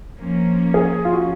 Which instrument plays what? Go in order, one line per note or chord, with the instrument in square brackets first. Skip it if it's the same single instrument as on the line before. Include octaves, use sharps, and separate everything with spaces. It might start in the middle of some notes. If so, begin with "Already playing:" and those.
[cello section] F3 A#3 C#4
[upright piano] G#4
F4
F#4